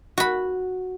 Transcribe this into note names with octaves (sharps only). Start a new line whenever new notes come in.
F#4 B5